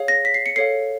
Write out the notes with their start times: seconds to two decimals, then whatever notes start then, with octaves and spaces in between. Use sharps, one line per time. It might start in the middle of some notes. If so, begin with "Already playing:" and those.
Already playing: G#4 C#5 F5
0.08 A#6
0.25 B6
0.34 C7
0.46 C#7
0.56 A4 C#5 F5 C7